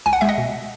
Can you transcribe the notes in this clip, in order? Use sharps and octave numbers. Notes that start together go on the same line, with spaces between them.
C#2 G#5
F#5
G#3 E5
D#5 F#5
B2